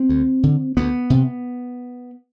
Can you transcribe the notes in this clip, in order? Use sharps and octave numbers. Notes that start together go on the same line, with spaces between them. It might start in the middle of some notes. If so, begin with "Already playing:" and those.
Already playing: C4
D2
D3
D2 B3
C3